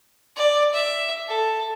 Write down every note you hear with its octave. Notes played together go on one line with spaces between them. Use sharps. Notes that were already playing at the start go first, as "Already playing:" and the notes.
D5
E5
A4